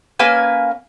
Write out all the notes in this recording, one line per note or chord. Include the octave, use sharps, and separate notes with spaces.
A#3 C#4 B4 G#5